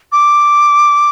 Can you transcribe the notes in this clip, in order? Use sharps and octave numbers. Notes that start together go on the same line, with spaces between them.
D6